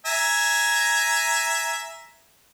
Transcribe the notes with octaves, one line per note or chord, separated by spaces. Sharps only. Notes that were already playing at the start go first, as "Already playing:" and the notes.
E5 G#5 A#5